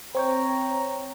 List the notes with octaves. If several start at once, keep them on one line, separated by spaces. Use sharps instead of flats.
C4 C#5 G5 A#5